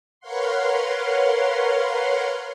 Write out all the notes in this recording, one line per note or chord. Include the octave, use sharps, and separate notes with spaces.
A#4 B4 C#5 F5 F#5 C6